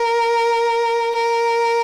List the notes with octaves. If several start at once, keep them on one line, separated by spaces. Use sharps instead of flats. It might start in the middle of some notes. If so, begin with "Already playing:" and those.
Already playing: A#4
A#4